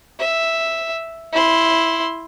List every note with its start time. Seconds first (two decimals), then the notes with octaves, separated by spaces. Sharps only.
0.19 E5
1.33 E4 C6